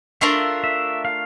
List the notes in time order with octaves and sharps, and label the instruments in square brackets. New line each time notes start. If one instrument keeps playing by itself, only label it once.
[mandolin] A3 D4 F4 A#4 [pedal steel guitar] E5
[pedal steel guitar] E5
F5